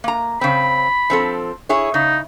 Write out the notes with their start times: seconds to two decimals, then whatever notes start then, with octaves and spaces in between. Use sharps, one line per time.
0.04 A#3 A#5
0.41 C#3 C4 B5
1.10 F3 C4 A4
1.69 E4 G#4 C#5
1.94 C#3 D#4